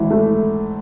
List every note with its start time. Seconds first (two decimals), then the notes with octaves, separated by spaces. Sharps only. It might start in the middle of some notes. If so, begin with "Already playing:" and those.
Already playing: G#1 E3
0.11 A3